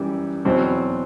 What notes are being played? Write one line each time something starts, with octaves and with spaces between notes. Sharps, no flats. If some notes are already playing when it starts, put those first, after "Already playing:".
Already playing: F#2 E3 G3
E2 B2 F#3 C4